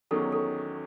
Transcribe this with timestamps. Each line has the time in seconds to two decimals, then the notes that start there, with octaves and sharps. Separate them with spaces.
0.11 E2 D#3 F#3 C#4 A4
0.32 A4